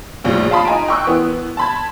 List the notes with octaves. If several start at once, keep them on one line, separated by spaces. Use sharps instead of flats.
A#1 D#2 A2 G3
F5 A5 B5 D#6
D#4 G#5 A#5 D7
G5 C6 C#6 D#6 E6 F#6
E3 B3
A5 B5 G#6